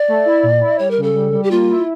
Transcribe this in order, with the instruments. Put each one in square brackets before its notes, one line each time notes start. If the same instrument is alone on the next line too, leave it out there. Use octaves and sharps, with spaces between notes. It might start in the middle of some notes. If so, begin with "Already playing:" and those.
Already playing: [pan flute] D5
[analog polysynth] A3
E4
A#2
E4
[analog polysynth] G3 [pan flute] C#5
[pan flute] A#4
[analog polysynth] C#3
[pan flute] A4
[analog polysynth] G3
G3
[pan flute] G4
[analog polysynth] A#3 [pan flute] F4
[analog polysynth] E4